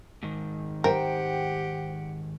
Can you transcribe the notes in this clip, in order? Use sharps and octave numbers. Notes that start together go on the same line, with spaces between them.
G#2 D#3
G4 A#4 C5 F#5 G5